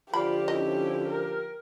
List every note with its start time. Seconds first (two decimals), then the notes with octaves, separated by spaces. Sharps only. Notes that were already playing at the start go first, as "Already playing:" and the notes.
0.14 D3 F3 F4 G4 C5 D5 B5
0.48 C#4 E4 D#5
1.08 A#4